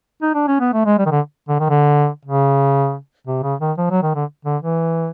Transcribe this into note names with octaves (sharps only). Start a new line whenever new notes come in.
D#4
D4
C#4
B3
A3
G#3
G3
D#3
D3
D3
D#3
D3
C#3
C3
C#3
D#3
F3
F#3
D#3
D3
D3
E3